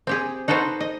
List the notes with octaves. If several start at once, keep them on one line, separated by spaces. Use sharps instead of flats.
C4 G4 G#4
D#4 F#4 A4 B4 C5
D#5